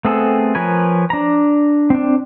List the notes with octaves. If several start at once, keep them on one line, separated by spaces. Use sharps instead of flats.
A3 B3 C4 G#4 A4
F3 A#4 B4 C#5 G#5
D4 A#5
C4 D4